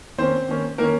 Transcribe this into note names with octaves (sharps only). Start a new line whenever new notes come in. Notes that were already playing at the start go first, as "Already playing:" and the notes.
D#3 A#3 C4 C#4 C5
D#3 A#3 C#4
D#3 A#3 C#4 A#4